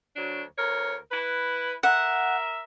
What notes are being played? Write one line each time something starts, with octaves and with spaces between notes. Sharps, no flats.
D2 F#3 D4
D2 A#4 C#5
E4 B4
A#4 E5 F#5